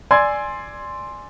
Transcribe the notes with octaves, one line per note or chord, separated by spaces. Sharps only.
D5 G#5 C6 E6 G#6